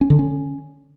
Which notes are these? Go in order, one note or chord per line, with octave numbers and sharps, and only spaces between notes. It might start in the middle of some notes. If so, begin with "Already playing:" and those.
C#4
D3
C#4